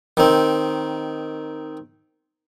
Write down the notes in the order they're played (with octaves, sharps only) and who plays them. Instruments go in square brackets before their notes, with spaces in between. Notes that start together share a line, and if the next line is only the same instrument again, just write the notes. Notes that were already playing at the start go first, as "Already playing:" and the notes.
[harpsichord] D#3 C4